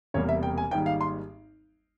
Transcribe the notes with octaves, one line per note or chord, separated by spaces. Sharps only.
E1 E2 C3 G3 A#3 C#5
E5
G5
G#5
G#1 G#2 G3 A#3 G5
F5
C6